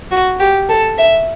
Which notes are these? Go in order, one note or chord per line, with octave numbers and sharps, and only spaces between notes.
F#4
G4
A4
E5